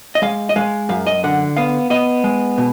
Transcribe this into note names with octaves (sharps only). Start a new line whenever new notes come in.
D#5
G#3 F5
D#5
G#3 F5
F#2 F5
D#5
D3 F#5
B3 F5
B3 D#5
G#3
B2